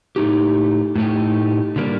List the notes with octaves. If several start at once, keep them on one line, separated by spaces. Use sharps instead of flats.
A2 A3 D#4 G4
A2 A3 D#4 G4
D3 G3 A#3